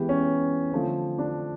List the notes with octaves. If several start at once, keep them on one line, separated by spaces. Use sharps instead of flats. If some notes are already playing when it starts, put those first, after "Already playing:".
Already playing: E3 G#3 B3 G4
C#4
D3 F3 A3 C4
D4